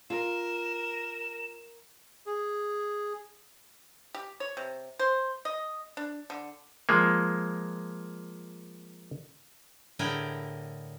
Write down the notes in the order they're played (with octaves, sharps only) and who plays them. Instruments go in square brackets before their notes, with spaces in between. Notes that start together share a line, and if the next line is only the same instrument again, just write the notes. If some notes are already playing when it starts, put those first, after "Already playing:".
[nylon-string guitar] F4 [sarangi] A#4 [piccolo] E7
[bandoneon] G#4
[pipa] G4
C#5
C3
C5
D#5
D4
D3
[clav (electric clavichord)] F3 G#3 A#3
[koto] A2 D3 E4 G#4 A#4 G5